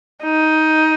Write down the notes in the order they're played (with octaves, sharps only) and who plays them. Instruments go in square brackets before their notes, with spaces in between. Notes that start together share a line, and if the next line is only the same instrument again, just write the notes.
[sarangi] D#4